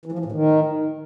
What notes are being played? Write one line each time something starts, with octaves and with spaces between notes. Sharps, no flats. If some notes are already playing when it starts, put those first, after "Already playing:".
E3
F3
E3
A2
D#3